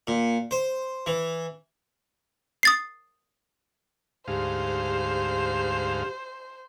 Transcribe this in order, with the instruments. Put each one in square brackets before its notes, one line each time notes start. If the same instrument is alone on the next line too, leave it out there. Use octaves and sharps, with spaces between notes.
[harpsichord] A#2
C5
E3
[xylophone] D#6 A6 C7
[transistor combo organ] D2 G#2 F5 [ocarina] G4 [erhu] C5